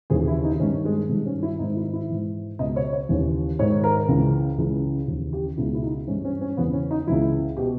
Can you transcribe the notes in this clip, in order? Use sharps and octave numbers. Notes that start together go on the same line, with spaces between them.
D#2 C#3 E3 G#4
E4
D#4
G2 D#3 C#4
G#3
G2 D#3 G#3
C#4
E4
G#2 D#3 D#4
E4
E4
G#2 E3
C#2 B2 D#5
C#5
C#5
D#2 C#3 E3
G#2 D#3 C#5
A#4
C#2 C#3 E3
C#2 C#3 E3
D#2 C#3 E3
G4
C#2 B2 E4
E4
D#4
G2 E3 C#4
C#4
C#4
E2 C#3 E3 B3
C#4
D#4
C#2 C#3 E3 E4
B2 G4